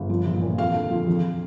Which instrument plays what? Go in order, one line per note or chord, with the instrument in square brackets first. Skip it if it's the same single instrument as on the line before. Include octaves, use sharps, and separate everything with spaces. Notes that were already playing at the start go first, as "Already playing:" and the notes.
Already playing: [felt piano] G1
F3
A#1
A#2
F2 F5
D3
F3
F2